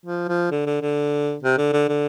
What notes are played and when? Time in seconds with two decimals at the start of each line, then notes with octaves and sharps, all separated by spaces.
0.06 F3
0.28 F3
0.51 D3
0.66 D3
0.82 D3
1.43 C3
1.58 D3
1.73 D3
1.88 D3